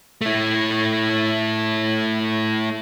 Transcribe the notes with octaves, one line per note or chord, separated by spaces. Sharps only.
A3 E4